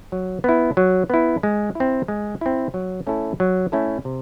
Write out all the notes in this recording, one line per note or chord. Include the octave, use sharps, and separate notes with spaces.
F#3
B3 E4
F#3
B3 E4
G#3
C4 E4
G#3
C4 E4
F#3
A3 C#4 E4 A4
F#3
A3 C#4 E4 A4
C3